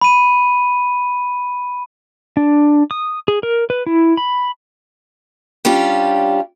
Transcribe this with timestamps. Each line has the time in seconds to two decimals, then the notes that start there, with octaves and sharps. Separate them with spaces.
0.01 B5 D#7
2.37 D4
2.91 D#6
3.28 G#4
3.43 A#4
3.70 B4
3.86 E4
4.17 B5
5.65 G3 C#4 D4 F4 G4